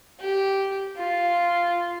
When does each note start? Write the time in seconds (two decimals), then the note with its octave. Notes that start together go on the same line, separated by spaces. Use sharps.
0.20 G4
0.96 F4